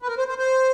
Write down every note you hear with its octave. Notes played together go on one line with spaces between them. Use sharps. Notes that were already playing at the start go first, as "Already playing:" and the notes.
B4
A#4
C5
C5
C5